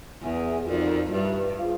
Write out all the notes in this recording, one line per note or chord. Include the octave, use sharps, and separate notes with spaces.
E2 G#4 B4 E5 G#5
F2 D#4 F#4 A#4 D5
G2 G4 B4 E5
F4 G#4 C5 F5